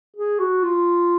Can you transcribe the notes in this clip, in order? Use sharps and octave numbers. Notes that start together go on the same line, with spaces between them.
G#4
F#4
F4